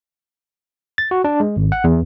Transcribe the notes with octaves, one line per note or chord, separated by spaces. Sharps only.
A6
F#4
D4
G#3
G#1
F#5
E2